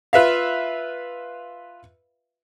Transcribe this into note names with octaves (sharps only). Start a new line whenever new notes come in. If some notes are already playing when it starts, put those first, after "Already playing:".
F4 B4 E5 F5